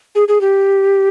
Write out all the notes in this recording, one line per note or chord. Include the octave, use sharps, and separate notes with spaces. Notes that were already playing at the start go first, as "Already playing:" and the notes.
G#4
G#4
G4